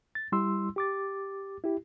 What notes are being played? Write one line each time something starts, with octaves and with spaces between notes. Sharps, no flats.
A6
G3 E4 C6 E6
G4 D6 A6
E4 G4